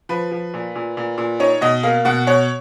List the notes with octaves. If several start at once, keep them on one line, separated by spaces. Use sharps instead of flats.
F3 B4
F3
A#2
A#2
A#2
A#2
D#4 C#5
B2 D#5
A#3 F5
B2 F#5
B2 C#5